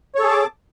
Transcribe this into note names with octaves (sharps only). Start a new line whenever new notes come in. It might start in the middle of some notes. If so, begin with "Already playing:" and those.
G#4 A4 C#5 A5 D6